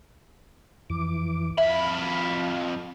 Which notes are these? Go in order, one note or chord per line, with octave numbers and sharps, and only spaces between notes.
F2 E3 D6
F2 E5 F5 B5